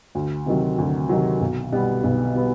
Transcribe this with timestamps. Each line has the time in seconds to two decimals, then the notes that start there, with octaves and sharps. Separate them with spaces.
0.15 D2
0.46 C3 D#3 F#3
0.78 D2
1.09 C3 D#3 F#3
1.41 B1
1.72 B2 G3 B3
2.04 B1
2.35 B2 G3 B3